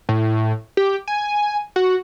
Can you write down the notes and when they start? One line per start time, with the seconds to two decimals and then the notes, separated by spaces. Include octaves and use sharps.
0.09 A2
0.77 G4
1.08 G#5
1.76 F#4